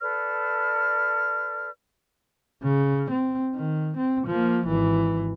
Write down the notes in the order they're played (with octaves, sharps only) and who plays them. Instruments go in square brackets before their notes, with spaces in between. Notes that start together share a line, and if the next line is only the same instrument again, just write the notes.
[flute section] A4 B4 D5 F6
[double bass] C#3
C4
D#3
C4
F3 A#3
G#1 E3